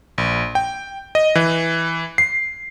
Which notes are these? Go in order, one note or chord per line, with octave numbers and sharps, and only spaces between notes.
A#1
G5
D#5
E3
C7